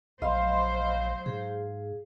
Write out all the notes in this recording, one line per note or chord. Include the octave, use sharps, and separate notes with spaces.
A#1 F#3 C5 D#5 F5 B5 C6
G#2 G#4